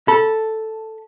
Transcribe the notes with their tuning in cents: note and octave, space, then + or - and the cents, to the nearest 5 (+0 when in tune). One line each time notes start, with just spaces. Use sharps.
A4 +0 B5 -30